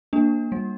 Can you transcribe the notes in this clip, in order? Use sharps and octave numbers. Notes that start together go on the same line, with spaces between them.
A#3 D4
G3